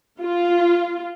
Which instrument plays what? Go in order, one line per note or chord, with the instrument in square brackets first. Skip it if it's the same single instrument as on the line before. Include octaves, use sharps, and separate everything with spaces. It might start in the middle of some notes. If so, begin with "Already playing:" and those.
[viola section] F4